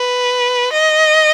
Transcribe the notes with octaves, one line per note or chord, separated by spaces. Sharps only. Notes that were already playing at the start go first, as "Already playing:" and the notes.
Already playing: B4
D#5